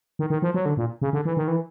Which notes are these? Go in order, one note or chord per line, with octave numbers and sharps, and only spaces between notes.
D#3
D#3
F3
F#3
D3
A#2
C#3
D3
E3
D#3
E3